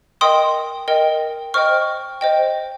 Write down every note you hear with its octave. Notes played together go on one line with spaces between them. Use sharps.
A#4 D#5 G5 C6 D#6
A#4 D#5 G5
C5 D#5 G5 C#6 F6
C5 D#5 G5